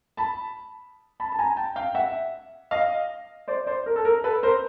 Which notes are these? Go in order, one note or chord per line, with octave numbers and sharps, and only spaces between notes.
A5 B5
A5 B5
A5
G#5 A#5
G5 A5
F5 G5
E5 F#5
D#5 F5
C5 D5
C5 D5
A#4
A4
A#4
A4 B4
A#4 C5